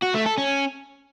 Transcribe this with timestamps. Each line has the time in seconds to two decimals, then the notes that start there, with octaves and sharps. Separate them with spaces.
0.03 F#4
0.15 A3
0.26 A4
0.38 C#4